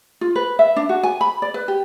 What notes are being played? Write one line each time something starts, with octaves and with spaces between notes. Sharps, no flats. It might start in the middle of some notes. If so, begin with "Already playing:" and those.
F4
B4
E5
D4
F#4
G#5
B5
D5
B4
G4